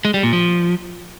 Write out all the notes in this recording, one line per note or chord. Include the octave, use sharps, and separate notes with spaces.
G#3
G3
A#2
F3